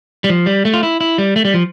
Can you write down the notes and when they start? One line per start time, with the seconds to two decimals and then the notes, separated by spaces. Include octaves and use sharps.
0.24 G3
0.30 F3
0.46 G3
0.65 A3
0.74 F4
0.83 E4
1.01 E4
1.18 G3
1.36 A3
1.45 G3
1.54 F3